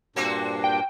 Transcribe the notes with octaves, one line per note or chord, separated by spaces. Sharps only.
G2 A#2 A#3 C4 D4 F#4
G5